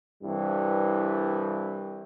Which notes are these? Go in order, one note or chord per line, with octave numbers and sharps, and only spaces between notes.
C2 G2 E3 E4